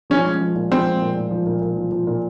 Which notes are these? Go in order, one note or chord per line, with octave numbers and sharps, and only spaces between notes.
F3 C#4
G#3
F3
A#2
F3 C4
G#3
A#2
A#2
F3
A#2
A#2
F3
F3
A#2